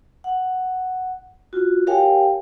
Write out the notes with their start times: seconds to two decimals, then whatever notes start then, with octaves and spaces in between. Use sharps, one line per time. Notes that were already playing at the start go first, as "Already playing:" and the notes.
0.24 F#5
1.53 F4 F#4
1.87 G4 A#4 C#5 F5 G5 G#5